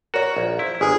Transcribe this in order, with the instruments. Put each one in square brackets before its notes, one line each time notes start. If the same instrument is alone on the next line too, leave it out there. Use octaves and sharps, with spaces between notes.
[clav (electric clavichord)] F#4 [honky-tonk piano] A#4 C#5 C#6
[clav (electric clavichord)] A#1
[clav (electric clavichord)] E4 [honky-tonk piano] C5
[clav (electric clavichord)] G1 [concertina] G#4